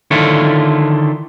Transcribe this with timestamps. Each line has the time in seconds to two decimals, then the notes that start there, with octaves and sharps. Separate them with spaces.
0.11 D3 D#3 E4 F4 A4 C#5